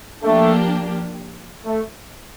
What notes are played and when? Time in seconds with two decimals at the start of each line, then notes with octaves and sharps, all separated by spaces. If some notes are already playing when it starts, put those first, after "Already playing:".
0.23 F3 A3 A#3 D4 G4
1.65 A3